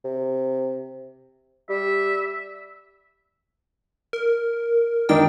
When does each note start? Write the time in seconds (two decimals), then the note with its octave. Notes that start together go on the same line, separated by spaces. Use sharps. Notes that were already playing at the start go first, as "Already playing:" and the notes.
0.04 C3
1.70 G3 E5
4.13 A#4
5.09 D#3 D4 D#4 G5